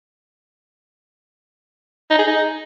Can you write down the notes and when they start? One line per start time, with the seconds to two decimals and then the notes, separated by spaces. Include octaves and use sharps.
2.10 D#4
2.19 G#4
2.27 D#4